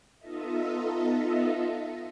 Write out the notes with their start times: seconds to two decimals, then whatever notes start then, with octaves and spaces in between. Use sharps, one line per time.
0.19 B3 D#4 F4 A4 D#5 E5